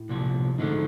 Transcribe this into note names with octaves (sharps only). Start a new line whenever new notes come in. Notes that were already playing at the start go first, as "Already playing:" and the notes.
Already playing: A2
C2 A#2 F3
G#2 D3 F3 A3